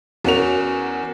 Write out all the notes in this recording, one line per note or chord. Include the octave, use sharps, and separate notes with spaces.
E2 C#4 F#4 A#4 F7